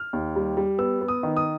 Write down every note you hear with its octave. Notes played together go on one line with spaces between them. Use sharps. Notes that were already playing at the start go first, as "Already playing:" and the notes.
Already playing: F6
D#2
G3
G3
B3 E6
B3
D#6
D#3
D#6